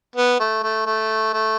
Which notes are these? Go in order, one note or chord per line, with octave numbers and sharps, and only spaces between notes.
B3
A3
A3
A3
A3